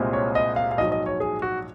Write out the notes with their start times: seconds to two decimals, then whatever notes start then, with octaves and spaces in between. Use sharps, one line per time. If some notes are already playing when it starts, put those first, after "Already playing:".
Already playing: C2 A#2 G#3 C4
0.13 C#5
0.35 D#5
0.56 F5
0.71 F5
0.78 A#1 G#2 F#3 D#5
0.92 D#5
1.06 C#5
1.20 G#4
1.42 F#4